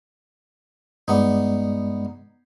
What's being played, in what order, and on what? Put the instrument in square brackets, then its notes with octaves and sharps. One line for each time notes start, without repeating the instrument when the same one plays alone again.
[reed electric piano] G2 G#3 D5 [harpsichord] B3 D#4